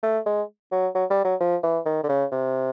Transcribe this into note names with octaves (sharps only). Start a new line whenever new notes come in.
A3
G#3
F#3
F#3
G3
F#3
F3
E3
D#3
D3
C#3
C3